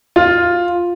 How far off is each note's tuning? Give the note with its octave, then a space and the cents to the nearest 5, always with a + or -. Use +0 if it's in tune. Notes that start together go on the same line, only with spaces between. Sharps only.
F4 +5